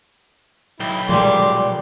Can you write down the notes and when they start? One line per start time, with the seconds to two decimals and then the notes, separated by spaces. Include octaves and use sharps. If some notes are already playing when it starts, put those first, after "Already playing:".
0.80 B1 E4 G5
1.09 A#2 F3 G3 G#3 C6 D6